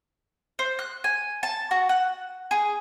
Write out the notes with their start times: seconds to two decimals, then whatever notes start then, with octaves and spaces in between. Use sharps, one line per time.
0.59 C5
0.79 F#6
1.04 G#5
1.43 A5
1.71 F#4
1.89 F#5
2.51 G#4